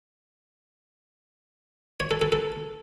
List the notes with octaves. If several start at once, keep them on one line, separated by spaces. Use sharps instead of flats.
C#5
A4
A4
A4